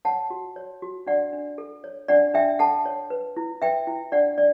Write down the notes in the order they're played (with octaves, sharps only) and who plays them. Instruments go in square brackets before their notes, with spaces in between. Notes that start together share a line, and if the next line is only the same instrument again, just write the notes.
[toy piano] C#5 F#5 A5
F#4
C#5
F#4
D4 D5 F#5
D4
A4
C#5
D4 D5 F#5
D4 E5 G5
A4 F#5 A5
C#5
B4
E4
B4 E5 G5
E4
D4 D5 F#5
D4 D5